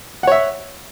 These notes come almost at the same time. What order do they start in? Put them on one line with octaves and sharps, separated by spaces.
F#5 C#5 E5